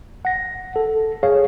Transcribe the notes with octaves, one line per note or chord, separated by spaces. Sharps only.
F#5 A#6
A4
G#4 C#5 F5